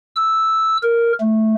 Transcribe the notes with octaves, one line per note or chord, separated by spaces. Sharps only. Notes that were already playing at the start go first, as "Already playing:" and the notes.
E6
A#4
A3